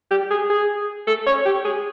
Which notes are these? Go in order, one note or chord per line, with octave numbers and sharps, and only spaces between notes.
G4
G#4
G#4
A4
C#5
G4
G#4